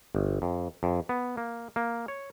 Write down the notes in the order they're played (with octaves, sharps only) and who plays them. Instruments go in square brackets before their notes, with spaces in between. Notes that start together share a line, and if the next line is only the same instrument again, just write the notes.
[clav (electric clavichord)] G1
F2
F2
B3
A#3
A#3
C#5